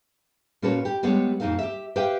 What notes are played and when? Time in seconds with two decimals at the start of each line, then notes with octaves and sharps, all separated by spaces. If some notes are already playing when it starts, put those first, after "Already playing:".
0.62 A#2 C#4 F#4 A4 B4 C#5
0.85 G4
1.03 G3 G#3 B3 G4 A4 C#5
1.40 F2 A#2 F#3 D#4 A4 F5
1.59 G4 E5
1.96 G4 B4 C5 E5 F5 G5